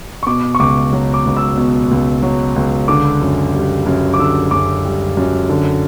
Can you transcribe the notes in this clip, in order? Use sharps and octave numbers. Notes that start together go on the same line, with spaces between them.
C#6
B2 D6
C#6
C#2 D6
F#3
D6
C#2
E6
B2
C#2
F#3
C#2
D3 D6
F#2
G3
F#2
D6
D3 E6
F#2 D6
G3
F#2
D3